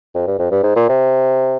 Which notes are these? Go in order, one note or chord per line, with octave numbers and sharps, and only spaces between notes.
F2
G2
F2
G2
G#2
A#2
C3